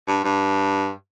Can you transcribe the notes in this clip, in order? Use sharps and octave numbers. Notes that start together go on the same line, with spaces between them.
G2
G2